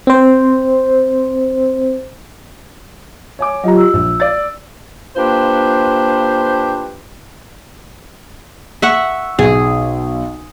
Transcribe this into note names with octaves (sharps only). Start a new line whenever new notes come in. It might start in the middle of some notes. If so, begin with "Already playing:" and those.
C4 C5
C#5 G#5 D6
F#3 F4 G4 D#5 A#5
E6
A#1
D5 A6
A#3 D4 F4 G4 B4 C5
E5 F#5 C#6
B1 G#4